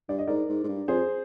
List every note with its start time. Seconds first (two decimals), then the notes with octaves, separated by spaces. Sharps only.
0.09 G2 D5
0.19 D#5
0.28 G#2 A#4 D5
0.49 G#2
0.64 G#2
0.68 G2
0.88 F2 G#4 C5